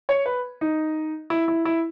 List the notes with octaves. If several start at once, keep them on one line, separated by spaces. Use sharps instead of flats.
C#5
B4
D#4
E4
E4
E4